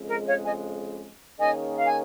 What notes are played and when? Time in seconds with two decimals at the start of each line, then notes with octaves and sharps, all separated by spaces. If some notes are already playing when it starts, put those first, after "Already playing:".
Already playing: F2 C#3 G#3
0.08 A#4
0.27 C#5 F5
0.46 D#5 G#5
1.39 D#3 A#3 C#4 G#4 D#5 G#5
1.76 F5
1.87 G#5